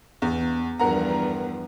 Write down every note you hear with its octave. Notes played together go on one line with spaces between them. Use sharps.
E2
E2 G2 F3 A#4 F#5 A#5